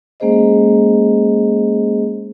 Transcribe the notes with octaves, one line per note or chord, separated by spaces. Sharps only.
G#3 A#3 C#4 G#4 C5 D#5